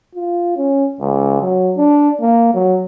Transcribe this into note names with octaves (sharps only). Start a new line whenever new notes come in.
F4
C#4
C#2
F#3
D4
A#3
F#3